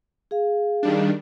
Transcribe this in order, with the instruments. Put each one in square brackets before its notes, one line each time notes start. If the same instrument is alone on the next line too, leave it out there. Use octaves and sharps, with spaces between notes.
[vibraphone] G#4 F5
[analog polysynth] D#3 G3 D4